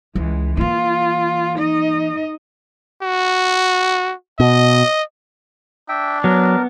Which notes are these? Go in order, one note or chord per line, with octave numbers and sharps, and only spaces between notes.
C#2 E3 G#3
E3 A#3 F4
D#4 D#5
F#4
B2 D#5
D4 E5 G5
F#3 B3 A#4